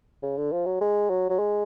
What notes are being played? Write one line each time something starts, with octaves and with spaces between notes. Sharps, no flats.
C#3
D3
F3
F#3
G#3
F#3
F#3
G#3